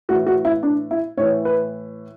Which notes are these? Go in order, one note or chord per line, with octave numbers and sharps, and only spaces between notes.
A2 E3 F#4
F#4
E4
D4
E4
A2 E3 C#5
B4